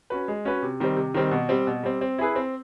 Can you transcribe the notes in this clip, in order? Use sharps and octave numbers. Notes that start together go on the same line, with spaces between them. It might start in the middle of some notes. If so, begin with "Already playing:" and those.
C#4 F#4 B4
G#3
C#4 F#4 B4
C3
D#3 G3 C4
C3
D#3 G3 C4
B2
G3 C4
B2
G3 C4
C4
E4 G#4 B4
C4